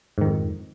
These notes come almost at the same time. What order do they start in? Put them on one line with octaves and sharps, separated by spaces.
G#2 D#3 F2